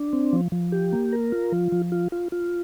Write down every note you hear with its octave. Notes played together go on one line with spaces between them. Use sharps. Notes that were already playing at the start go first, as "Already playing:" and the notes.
Already playing: D4
C4
F3
F3
G4
A#3
A#4
F4
F3
F3
F4
F4
F4